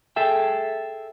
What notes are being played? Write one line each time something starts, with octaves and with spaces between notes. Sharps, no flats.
G#4 A4 E5 G5